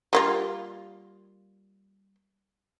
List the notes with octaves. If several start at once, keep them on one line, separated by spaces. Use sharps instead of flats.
G3 A#3 F4